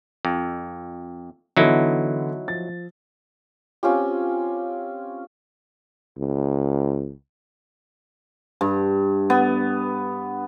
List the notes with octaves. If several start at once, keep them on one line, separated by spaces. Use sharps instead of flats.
F2
D3 E3 F#3 B3 D#4 E4
F3 A6
C4 C#4 F4 G4
C#2
G2
B3